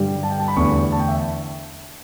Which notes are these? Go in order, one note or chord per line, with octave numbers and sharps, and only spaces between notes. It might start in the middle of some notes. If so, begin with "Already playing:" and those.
Already playing: G2 D3 G3
A5
G5
A5
B5
E2 D3 A3 C#6
A5
G5
E5